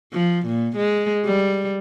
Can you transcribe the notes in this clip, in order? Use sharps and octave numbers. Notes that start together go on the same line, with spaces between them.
F3
A#2
G#3
G3